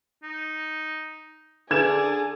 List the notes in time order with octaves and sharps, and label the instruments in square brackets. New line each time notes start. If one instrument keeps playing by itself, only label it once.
[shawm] D#4
[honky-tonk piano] D3 G#6 E7 [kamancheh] G#4 [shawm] D5